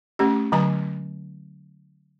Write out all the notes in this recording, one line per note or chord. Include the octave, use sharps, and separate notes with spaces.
A3 C#4 G4
D3 F#3 G#5 A#5